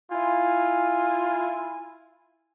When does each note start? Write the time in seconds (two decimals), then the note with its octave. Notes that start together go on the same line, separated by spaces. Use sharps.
0.12 E4 F4 G#5